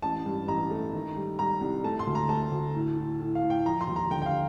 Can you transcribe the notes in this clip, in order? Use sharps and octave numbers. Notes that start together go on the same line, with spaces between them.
A1 A5
G2
A1 A#5
A3
D#3
G3
G3 A#5
C2
A3 A5
C6
D2
A#5
A3 A5
D2
A2
A2
A2
F5
A2
G5
F3 A#5
C6
D#2
A#5
D3 G5
G5
F5